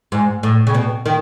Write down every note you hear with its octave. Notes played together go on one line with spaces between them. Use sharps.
G#2
A2
C#3
B2
D#3